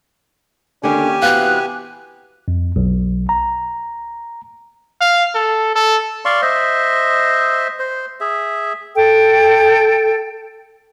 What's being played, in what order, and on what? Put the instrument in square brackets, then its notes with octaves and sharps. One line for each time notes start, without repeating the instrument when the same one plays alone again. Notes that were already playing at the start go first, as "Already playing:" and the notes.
[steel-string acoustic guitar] D3 D4 [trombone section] D#3 A#3 C#4 [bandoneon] G4 G#5
[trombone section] C3 E3 B3 [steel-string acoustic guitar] F#4 F5 [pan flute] F#6
[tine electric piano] F2
B1
A#5
[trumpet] F5
A4
A4
[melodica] D5 F5 C6 C#6
C5 D#5 E5
C5
G#4 E5
[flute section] A4 G5